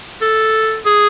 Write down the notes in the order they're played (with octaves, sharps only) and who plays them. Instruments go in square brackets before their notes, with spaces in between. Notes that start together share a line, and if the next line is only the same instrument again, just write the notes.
[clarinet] A4
G#4